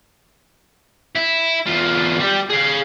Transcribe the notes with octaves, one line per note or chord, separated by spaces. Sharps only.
E4
E2 F4
G3 G4
G#4 F5